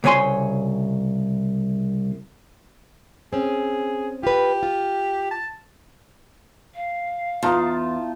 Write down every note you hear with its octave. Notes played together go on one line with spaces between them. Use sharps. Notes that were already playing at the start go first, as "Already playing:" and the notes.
C2 C#3 C#5 G#5 C6
C4 C#4 G#4
F4 G4 B4
F4
A5
F5
E2 D#4 F4 A5